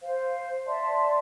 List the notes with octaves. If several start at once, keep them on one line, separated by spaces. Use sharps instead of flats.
C5 F5
D5 E5 A5 C6